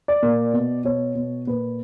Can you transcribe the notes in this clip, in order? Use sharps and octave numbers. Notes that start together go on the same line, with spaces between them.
D5
A#2
B2
B2 C#5
B2
A#2 B4